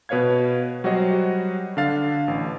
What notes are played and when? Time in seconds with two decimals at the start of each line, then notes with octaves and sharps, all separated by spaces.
0.09 B2 B4 C#5 F5 G#6
0.84 F#3 G3 F#4 C5 C#5 D#5
1.77 D3 D4 F5 A6
2.28 A1